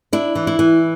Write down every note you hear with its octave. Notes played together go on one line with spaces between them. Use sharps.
D4 E4
E3
E4
E3